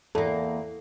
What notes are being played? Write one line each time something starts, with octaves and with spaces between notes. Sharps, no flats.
E2 A#3 A4